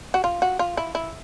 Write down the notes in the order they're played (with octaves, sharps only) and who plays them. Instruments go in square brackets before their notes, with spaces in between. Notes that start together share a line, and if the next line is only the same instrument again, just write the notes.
[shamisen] F#4
F4
F#4
F4
E4
E4